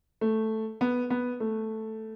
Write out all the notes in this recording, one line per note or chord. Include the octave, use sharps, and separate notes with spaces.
A3
B3
B3
A3